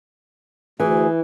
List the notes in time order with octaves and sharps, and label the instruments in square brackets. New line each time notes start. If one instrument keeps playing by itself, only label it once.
[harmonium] D2 [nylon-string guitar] E3 [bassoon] G#4